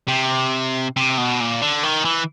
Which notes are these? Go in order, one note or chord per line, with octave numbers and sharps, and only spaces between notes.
C3
C3
B2
A#2
D3
D#3
E3